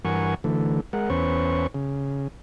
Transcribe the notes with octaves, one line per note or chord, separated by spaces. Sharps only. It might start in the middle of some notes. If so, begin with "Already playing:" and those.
G2 E3 A#4 F#5 G#5 C#6
D3 E3 A3
G#3 A#4 F#5
E2 C#4 B4 C5 C#6
C#3